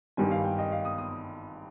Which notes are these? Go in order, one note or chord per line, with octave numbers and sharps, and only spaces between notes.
G#1 G2 D#3 G3 G#5
F5
G5
D#5
F5
D#6
D#6